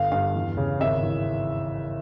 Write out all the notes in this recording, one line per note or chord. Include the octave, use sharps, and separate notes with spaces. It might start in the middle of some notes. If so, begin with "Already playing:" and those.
Already playing: G1 F5
G2 F5
E2
C#3
G#1 E5
E3